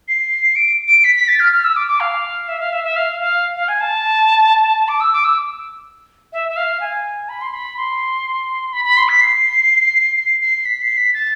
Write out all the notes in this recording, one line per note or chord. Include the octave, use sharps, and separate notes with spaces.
C7
D7
D7
B6
B6
A6
F6
F6
E6
D6
D6
F5
E5
F5
E5
E5
F5
F5
F5
G#5
A5
D6
E6
D6
E6
E5
E5
F5
G#5
B5
C6
B5
C6
B5
B5
C6
B6
C7
C7
C7
B6
C7
B6
A6